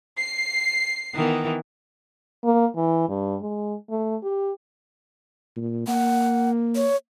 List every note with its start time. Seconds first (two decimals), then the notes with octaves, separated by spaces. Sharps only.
0.20 C7
1.15 D#3 E3 B3
2.44 A#3
2.75 E3
3.08 G2
3.41 G#3
3.90 A3
4.23 G4
5.56 A#2
5.87 A#3 F#5
6.75 C#5